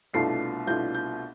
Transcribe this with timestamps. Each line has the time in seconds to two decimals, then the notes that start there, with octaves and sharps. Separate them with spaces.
0.13 C2 B2 A3 D4 F4 C7
0.67 C2 B2 A3 D4 F4 G6
0.95 G6